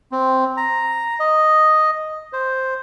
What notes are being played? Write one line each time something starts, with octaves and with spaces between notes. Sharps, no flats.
C4
A#5
D#5
C5